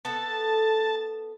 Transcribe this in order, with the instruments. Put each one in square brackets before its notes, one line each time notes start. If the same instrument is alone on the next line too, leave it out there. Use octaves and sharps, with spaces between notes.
[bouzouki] B3 A4 [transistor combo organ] A5